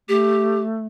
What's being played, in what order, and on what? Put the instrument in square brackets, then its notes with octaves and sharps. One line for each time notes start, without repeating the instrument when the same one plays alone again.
[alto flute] A3 [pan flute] G4